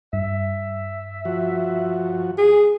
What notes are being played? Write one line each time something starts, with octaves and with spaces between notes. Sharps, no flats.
G2 E5
F3 F#4
G#4